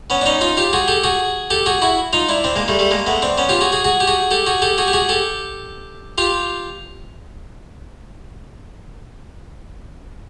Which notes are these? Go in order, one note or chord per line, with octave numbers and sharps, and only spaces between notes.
B3 C#4
D4
C#4 D#4
D#4 F4
F4 G4
F#4 G#4
G4 A4
F#4 G#4
G4 A4
F#4 G#4
E4 F#4
D#4 F4
D4 E4
C4 D4
G#3 A#3
G3 A3
G3 A3
G#3 A#3
A3 B3
C4 D4
B3 C#4
F4 G4
F#4 G#4
F#4 G#4
F#4 G#4
G4
F#4 G#4
G4 A4
F#4 G#4
G4 A4
F#4 G#4
G4
F#4 G#4
G4 A4
F4 G4